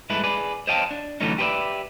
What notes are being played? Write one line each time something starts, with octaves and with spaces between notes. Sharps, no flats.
G2 G#3 A3 E4 B4
G#4 B4 D5
C5 C#5 D#5 F5 G5 A5
D4
D3 E3 F#3 A3 C#4 D#4
G4 G#4 B4 C5 D5 E5